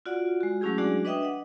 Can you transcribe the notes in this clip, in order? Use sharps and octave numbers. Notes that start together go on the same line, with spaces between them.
F4 F#4 D5 F#5
G#3 F#4
F#3 A3 C#4 E4 G4 G#4
F#3 G#3 D4 F#4 G#4 D5
D4 B4 D#5 E5 G5 D#6
D#5 F#5